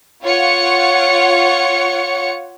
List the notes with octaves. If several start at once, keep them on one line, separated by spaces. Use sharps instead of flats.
F4 C#5 F#5 C#7